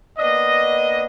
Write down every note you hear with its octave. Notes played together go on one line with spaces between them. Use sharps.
A#3 B3 D4 D#5